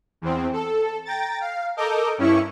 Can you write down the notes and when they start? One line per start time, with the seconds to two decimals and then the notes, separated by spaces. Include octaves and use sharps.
0.22 E2 C4
0.53 A4
1.05 G5 A#5 A6
1.41 F5
1.77 A4 A#4 D#5 D6 G6
2.18 G2 C#4 E4 C#6